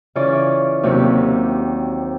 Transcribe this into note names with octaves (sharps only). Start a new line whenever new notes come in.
C#3 E3 F4 C#5 D5
D#2 C3 F#3